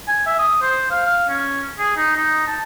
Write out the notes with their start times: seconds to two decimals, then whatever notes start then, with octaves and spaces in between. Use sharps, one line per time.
0.08 G#5
0.26 E5
0.39 D#6
0.62 C5
0.91 F5
1.05 F5
1.29 C#4
1.79 G#4
1.97 D#4
2.16 D#4
2.47 A5